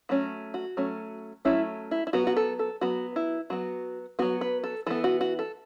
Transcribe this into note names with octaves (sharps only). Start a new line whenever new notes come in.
F#3 A3 C#4 F#4
F#4
F#3 A3 C#4
F#3 A3 C#4 E4
E4
E4
F#3 B3 F#4
F#4
A4
A4
F#3 B3 F#4
E4
F#3 B3 F#4
F#3 B3 F#4
B4
A4
E3 B3 A4
F#4
F#4
A4